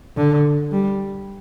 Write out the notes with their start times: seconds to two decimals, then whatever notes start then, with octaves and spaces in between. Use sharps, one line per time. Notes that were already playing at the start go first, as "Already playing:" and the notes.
0.17 D3
0.71 G3